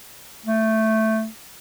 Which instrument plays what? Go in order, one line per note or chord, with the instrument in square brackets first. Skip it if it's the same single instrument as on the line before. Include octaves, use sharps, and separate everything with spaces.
[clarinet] A3